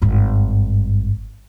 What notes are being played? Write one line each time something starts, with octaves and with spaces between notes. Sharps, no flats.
G#1 G2